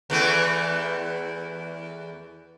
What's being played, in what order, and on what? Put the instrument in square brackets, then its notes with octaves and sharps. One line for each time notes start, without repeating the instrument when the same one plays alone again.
[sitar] E2 E3 A3